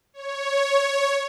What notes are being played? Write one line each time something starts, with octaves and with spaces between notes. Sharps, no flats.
C#5